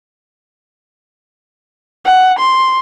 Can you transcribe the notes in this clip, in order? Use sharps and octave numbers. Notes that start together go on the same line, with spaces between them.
F#5
C6